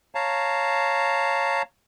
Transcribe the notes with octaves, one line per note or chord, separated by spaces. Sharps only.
C#5 F5 A5 A#5